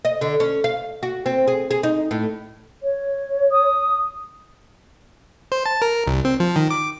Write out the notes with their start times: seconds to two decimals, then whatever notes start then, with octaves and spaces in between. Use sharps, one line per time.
0.05 D#5
0.21 D3
0.40 C#4
0.64 F5
1.03 F#4
1.26 C4
1.48 G#4
1.71 G#4
1.83 D#4
2.11 A2
2.83 C#5
3.52 D#6
5.52 C5
5.66 A5
5.82 A#4
6.07 C2
6.25 C4
6.40 F3
6.56 D#3
6.71 D6